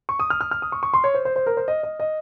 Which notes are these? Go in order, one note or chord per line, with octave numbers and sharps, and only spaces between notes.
C#6
D#6
F6
F6
F6
D#6
C#6
C#6
C6
C#5
C5
C5
C5
A#4
C5
D#5
D#5
D#5